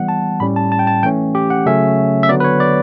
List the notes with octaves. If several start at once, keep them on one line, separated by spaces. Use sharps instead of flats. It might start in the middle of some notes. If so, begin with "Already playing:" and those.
Already playing: E3 G3 B3 F#5
A5
A2 G3 C#4 B5
A5
A5
G5
A5
E3 A3 C#4 G5
G4
F#5
C#3 F#3 A3 C#4 E5
E5
D3 F#3 B3 D5
B4
C#5
D5